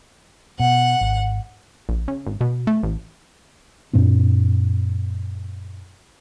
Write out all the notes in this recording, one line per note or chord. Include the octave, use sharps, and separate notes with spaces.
B2 F#5
G#1
A#1
C#3
G#1
B2
A3
A1
F#2 A#2 C4 D4